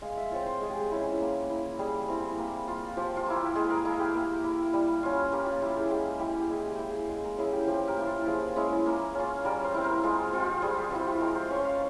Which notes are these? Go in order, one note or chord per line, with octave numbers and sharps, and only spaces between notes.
G#3 F5
E5
C4 F4 C#5
C5
G#3 G#4
G4
G#4
C#4 E4
A#3
E4
G3 G#4
C4 E4
A#3
F4
F3 G4
F4
A#3 E4
G4
G#3 G#4
A#4
E4 G#4
G4
A#3
E4
G3
C#4 F4
A#3 G4
F4
E4 G4
G#4
G#3 G4
E4 G4
G4
G#3 G#4
G4
E4
G#4
G#3
A#4
C#4 E4 G#4
G4
F3 G4
A#4
A#3 E4
F4
F3 G#4
G#3 C#4 E4
A#3
C#4 F4
G3 A#4
C5
C4 E4
A#4
G#3 F4
C4 F4
G4
G3 G#4
G4
C4 E4 F4
G4
G#3 A#4
C5
C#4 F4 C#5
F5